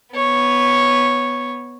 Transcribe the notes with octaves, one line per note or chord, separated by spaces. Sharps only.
B3 C#5